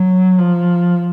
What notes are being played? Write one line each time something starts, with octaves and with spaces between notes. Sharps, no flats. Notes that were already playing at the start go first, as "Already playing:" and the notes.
Already playing: F#3
F3